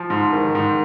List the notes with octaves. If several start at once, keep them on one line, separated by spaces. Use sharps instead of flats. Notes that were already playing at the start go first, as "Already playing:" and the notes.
Already playing: F3
G#2
D#3
G#2